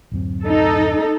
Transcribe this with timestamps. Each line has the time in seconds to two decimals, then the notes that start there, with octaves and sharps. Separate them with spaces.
0.12 D1 F#2 C4
0.43 D#4 A4